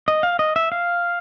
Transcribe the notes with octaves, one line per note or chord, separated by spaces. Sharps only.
D#5
F5
D#5
E5
F5